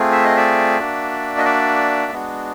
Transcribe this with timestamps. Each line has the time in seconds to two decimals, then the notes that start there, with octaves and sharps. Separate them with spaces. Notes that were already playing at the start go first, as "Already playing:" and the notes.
Already playing: A3 C4 F4 G#4
0.13 E5
0.25 D#5
0.37 D5 E5
0.79 A#3 D4 F#4
1.38 D#5
1.45 D5 E5
2.12 G#3 B3 D4 F#4